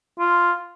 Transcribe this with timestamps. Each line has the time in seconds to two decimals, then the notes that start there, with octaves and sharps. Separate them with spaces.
0.19 F4